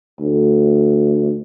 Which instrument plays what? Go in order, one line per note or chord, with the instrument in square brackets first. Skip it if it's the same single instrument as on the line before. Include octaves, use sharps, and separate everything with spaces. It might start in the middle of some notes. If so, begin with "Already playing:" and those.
[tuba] D2